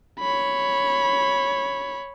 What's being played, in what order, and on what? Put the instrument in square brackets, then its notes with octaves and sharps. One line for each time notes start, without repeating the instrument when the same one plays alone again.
[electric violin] C#5 B5